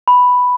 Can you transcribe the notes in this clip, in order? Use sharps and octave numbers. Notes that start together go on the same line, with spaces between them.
B5